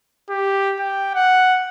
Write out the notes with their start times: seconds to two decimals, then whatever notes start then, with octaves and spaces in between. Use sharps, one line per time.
0.30 G4
0.79 G5
1.15 F#5